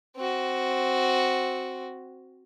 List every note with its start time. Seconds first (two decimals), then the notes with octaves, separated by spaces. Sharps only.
0.16 C4 F#4